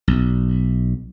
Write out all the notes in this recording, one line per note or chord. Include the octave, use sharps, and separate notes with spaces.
B1